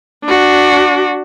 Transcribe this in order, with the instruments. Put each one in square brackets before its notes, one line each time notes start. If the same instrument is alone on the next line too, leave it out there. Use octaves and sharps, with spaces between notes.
[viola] D4 F#4